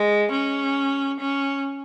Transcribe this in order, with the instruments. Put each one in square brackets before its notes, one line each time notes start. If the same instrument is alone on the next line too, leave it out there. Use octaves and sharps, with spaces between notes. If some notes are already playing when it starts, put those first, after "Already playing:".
Already playing: [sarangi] G#3
C#4
C#4